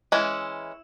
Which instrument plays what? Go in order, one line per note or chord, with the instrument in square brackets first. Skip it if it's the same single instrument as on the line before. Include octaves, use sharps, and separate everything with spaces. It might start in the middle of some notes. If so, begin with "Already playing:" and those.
[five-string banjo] E3 G#3 C#4 E4